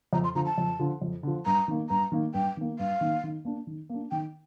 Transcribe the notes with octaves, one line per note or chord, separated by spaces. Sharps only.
F2 A#5
C6
D3 F3 A#5
A5
F2
D3 F3
F2
D3 F3
G2 A#5
D#3 A#3
G2 A#5
D#3 A#3
G2 G5
D#3 A#3
G2 F5
D#3 A#3
D#3
A#3 D4
D#3
A#3 D4
D#3 G5